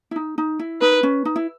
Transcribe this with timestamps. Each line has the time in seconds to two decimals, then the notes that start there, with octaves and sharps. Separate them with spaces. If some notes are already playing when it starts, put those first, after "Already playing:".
0.11 E4
0.16 D#4
0.38 D#4
0.59 E4
0.81 D#4 B4
1.03 C#4
1.25 D#4
1.36 E4